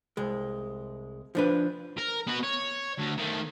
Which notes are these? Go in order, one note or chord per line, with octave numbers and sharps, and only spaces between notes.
C2 G#3
F3 D4 B4
A#4
B3 F#4
C#5
D2
D#3 A3